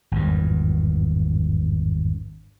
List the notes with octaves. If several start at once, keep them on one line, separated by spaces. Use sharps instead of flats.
G#1 E2 G2